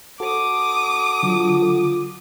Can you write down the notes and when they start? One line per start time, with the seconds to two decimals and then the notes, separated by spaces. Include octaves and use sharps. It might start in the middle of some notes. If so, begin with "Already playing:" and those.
0.20 F#4 A4 D6 D#6
1.23 D3 F#3 F4